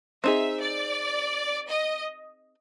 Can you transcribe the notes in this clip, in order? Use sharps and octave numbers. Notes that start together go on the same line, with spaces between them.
C4 D#4 G#4 E5
D5
D#5